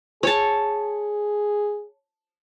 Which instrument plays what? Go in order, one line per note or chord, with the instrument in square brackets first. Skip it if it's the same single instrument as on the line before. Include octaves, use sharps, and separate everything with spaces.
[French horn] G#4 [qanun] C#5 A5